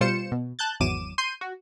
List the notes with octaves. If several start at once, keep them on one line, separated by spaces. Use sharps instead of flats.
B2 G3 F4 C5 C#7 E7
B2
A5 F#6 G6 A6
G#1 E2 F#3 D6 D#7 E7
C6 G6 C7 D#7
F#4